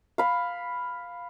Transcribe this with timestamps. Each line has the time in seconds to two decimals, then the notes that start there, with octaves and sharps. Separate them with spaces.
0.18 F5 B5